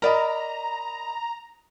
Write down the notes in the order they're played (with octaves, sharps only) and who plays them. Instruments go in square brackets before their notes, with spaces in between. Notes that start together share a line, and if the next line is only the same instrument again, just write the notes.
[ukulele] A#4 D5 [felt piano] D#5 B5 [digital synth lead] A#5